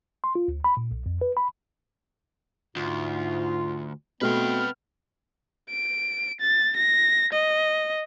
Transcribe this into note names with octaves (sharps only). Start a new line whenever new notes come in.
C6
F4
D2
B5
A#2
B1
F2
B4
B5
D2 G#2 F4
B2 A3 B3 C4 B4 G5 F6
D7
A6
A#6
D#5